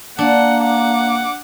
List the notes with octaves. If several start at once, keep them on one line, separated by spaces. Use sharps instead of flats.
A#3 D4 F#5
F#5 D6